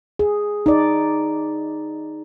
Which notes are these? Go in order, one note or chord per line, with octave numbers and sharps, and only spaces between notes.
G#4
D#4 D5